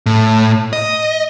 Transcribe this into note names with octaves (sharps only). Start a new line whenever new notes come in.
A2
D#5